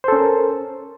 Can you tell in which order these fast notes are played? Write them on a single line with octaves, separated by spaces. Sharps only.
C5 A4 C#4 A#4